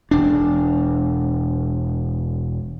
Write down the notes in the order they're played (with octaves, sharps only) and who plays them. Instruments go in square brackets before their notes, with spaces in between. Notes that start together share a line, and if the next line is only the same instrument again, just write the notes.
[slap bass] E1 D4